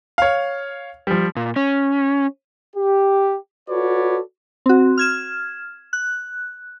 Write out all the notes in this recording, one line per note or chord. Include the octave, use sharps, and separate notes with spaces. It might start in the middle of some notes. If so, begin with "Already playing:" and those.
C#5 F5
F3 G3
A#2
C#4
G4
F4 F#4 A4 B4 C#5 D5
C4 F#4
F6 G#6 E7
F#6